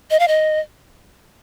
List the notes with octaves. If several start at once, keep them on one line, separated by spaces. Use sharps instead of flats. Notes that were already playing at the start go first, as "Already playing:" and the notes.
D#5
F5
D#5